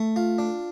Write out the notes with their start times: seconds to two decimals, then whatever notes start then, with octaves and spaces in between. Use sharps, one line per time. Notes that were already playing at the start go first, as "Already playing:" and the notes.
Already playing: A3
0.16 F4
0.38 D4